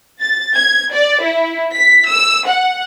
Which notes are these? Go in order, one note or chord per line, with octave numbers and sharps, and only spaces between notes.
A6
G#6
D5
E4
B6
E6
F#5